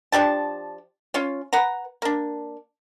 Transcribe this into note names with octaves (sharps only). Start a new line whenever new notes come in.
F3 D4 G4 A5
C#4 F4 C#5
B4 F#5 A#5
A#3 D4